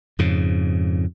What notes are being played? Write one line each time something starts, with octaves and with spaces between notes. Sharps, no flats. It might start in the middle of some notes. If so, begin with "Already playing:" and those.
F2 G#2 C#3